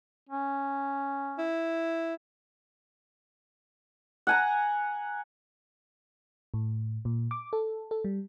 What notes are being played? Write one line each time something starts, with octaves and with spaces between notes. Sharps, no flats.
C#4
E4
F#5 G#5 A#5
A2
A#2
D6
A4
A4
G3